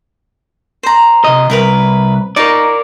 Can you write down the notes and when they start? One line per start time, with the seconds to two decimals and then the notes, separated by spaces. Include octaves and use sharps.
0.83 C5 A#5
1.24 C3 D#5
1.50 C2 E4 A#4 B4
2.36 D#4 A#4 D5 C#6